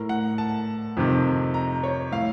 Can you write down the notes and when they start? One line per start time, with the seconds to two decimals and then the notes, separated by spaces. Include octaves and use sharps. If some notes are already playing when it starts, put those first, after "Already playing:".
Already playing: A2 A#4
0.09 F#5
0.38 A5
0.97 F2 C3 D#3
1.54 A#5
1.83 C#5
2.12 A2 F5